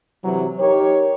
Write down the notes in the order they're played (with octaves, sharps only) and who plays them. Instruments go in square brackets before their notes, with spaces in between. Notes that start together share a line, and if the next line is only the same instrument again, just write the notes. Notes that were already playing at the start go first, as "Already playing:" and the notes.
[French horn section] C3 E3 F#3
D#4 G4 A#4 C#5